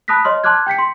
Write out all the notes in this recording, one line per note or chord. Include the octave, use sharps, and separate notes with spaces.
A5 B5 D#6 F#6 A#6 B6
C#5 D#5 C6 F6
A5 C6 D6 F6 F#6 G#6
G5 G6 B6 C#7
C6